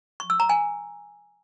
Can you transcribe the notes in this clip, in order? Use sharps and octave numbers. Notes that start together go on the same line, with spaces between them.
C#6
E6
A#5
G#5